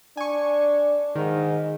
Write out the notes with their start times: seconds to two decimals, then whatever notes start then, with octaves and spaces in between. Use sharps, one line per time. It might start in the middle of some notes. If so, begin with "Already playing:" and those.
0.17 D4 G#5 C#6
1.16 G#2 D#3